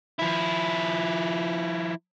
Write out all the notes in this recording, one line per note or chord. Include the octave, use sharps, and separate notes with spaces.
F3 E4